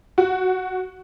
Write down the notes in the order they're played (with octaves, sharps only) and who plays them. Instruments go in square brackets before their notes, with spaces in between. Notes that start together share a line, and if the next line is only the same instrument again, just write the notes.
[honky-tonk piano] F#4